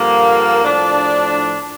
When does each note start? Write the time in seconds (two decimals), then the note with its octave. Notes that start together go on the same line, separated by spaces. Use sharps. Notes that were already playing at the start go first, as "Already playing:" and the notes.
Already playing: G2 D3 F3 A#3
0.63 A2 F3 D4